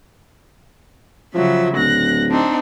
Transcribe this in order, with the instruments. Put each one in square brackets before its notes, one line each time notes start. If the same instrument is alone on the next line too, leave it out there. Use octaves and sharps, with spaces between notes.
[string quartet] C#3 F#3 E5 [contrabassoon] F3
[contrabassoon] D1 [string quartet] F#6 A#6
[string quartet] C4 D4 D#4